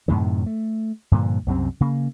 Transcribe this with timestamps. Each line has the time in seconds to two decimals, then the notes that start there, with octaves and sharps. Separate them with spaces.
0.08 F#2 A2 C3 D#3
0.46 A3
1.12 G2 A#2 D3 F3
1.47 C2 F#2 C3 C4
1.81 C#3 A#3